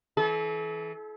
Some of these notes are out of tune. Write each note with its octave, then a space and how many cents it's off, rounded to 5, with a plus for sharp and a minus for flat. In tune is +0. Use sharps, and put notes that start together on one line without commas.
E3 -15 A4 -45